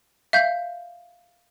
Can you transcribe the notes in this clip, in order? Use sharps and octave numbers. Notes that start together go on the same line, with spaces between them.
E5 F5 G6